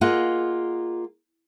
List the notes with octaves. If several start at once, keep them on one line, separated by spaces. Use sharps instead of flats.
A#3 F4 G#4 D#5 F#5